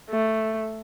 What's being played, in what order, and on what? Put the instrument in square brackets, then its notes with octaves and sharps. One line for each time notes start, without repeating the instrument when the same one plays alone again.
[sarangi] A3